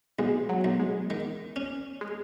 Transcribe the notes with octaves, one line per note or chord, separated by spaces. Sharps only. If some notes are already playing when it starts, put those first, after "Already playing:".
B1 G#3
F#3
B1
G#3
D#3
C#4
G#3